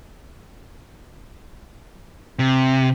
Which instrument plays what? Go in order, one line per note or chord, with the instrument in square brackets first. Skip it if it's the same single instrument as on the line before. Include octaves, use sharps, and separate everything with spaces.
[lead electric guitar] C3